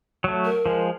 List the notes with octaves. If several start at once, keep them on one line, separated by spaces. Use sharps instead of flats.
F#3 A3
A#4
F3 G#3